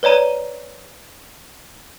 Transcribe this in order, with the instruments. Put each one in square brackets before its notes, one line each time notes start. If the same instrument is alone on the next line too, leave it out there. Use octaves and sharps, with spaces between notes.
[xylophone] B4 C#5 D5 A#5 D#7